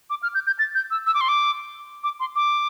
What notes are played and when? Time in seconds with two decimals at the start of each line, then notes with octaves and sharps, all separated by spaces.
0.10 D6
0.23 F6
0.34 G6
0.47 G6
0.59 A6
0.75 G6
0.91 E6
1.06 E6
1.14 D6
1.21 C6
1.29 D6
2.04 D6
2.20 C6
2.36 D6